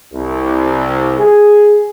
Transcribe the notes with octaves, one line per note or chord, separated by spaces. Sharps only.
C2
G#4